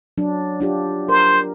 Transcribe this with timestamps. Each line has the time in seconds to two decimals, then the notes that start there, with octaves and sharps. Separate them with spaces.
0.18 F#3 D4
0.60 D4 F4 G4
1.09 A#4 C5